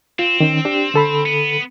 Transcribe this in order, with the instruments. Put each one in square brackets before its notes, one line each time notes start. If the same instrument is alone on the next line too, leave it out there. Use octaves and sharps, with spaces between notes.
[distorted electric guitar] C4 [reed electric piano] F4
[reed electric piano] D#3 C#4
D4 G4
D3 A4 B5
[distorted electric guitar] B3